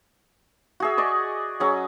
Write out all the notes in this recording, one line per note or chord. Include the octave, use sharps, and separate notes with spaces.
F#4 G#4 E5
D5 D#5 C#6
F#3 C#4 G#4